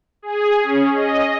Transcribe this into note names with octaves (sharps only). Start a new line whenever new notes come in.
G#4
C#4
D#5